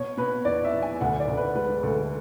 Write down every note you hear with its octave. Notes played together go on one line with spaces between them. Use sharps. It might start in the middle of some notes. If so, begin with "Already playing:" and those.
Already playing: B2 C#5
B2 B4
E2 D5
E5
E2
G#5
D2 F#5
D5
D2
B4
G#3 B4
D2 A4